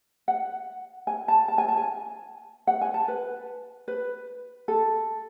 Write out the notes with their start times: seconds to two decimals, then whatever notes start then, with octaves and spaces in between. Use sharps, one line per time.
0.28 F#5
1.07 G#5
1.28 A5
1.48 A5
1.58 G#5
1.68 A5
1.77 G#5
2.67 F#5
2.81 G#5
2.94 A5
3.08 B4
3.88 B4
4.68 A4